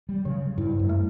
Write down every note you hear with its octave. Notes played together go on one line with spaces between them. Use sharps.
G3
C#3 F#3
G2 E4
F#2
A3